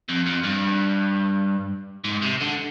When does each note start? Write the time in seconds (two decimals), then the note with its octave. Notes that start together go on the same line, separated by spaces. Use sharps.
0.09 F2
0.27 F2
0.44 G2
2.04 G#2
2.22 C3
2.40 D3